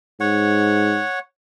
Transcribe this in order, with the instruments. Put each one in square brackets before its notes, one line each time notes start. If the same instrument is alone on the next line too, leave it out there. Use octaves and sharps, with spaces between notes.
[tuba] G#2 [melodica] C#5 F#5